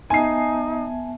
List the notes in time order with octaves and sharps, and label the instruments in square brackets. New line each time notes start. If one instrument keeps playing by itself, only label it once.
[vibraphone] B3 E5 A5 [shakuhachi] D#4 [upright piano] G#5 C7